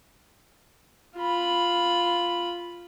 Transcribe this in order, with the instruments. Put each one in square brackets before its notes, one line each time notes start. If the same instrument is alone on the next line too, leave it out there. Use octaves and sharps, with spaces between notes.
[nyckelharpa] F4 B5